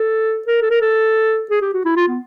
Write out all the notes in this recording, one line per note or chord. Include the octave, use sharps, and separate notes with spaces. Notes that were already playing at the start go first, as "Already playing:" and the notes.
Already playing: A4
A#4
A4
A#4
A4
G#4
G4
F#4
E4
F4
B3